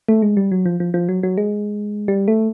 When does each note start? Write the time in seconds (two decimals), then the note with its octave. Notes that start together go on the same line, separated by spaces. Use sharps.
0.09 A3
0.22 G#3
0.37 G3
0.52 F#3
0.66 F3
0.80 F3
0.94 F3
1.09 F#3
1.23 F#3
1.38 G#3
2.08 G3
2.28 A3